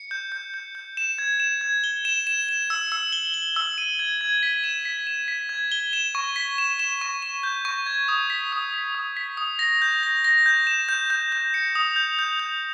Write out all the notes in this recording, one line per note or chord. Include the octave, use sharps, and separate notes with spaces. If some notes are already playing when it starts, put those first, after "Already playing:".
Already playing: C#7
G6
G6
G6
G6
E7
G#6
E7
G#6
G7
E7
E7
E7
E6
E6
G7
G7
E6
D#7
G#6
G#6
B6
E7
B6
E7
B6
G#6
G7
E7
C#6
B6
E7
E7
C#6
E7
G6
C#6
G#6
D#6
B6
D#6
B6
D#6
B6
D#6
A#6
G6
A#6
A#6
G6
E7
G6
G6
G6
C#7
D#6
G6
G6
G6